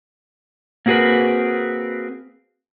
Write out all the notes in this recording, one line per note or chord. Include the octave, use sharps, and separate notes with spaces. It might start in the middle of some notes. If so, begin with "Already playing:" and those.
A#3 C4 F#4 G#4 A#4 B4